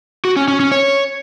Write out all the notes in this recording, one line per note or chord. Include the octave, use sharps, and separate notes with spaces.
F#4
C#4
C#4
C#4
C#5